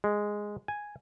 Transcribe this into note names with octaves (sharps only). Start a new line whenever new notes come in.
G#3
G#5